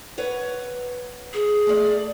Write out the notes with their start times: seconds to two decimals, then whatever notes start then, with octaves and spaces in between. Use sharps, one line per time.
0.18 B4 C#5 F#5
1.34 G#4
1.67 A3 D5